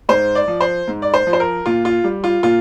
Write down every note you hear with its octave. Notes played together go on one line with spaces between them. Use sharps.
G#2 C5
D5
F3
C5
G#2
D5
C5
F3
C5
A#4
A#2 F4
F4
G3
F4
A#2 F4